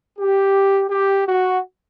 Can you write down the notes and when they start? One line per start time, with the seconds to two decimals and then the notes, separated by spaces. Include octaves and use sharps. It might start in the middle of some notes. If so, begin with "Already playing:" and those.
0.19 G4
0.91 G4
1.27 F#4